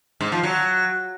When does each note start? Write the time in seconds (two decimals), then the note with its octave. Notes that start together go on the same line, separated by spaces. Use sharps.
0.21 G#2
0.32 F3
0.43 F#3